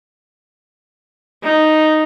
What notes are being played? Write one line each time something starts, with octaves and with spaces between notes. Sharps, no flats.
D#4